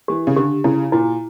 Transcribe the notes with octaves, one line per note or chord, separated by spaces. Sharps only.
E3 G4
C#3
D3 G4
C#3 E4
A#2 E4